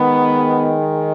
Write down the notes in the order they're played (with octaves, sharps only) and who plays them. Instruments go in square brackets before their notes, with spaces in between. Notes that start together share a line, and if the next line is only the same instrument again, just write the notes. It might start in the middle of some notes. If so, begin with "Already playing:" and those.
Already playing: [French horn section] D#3 G#3 B3